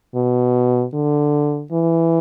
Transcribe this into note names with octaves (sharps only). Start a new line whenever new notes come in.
B2
D3
E3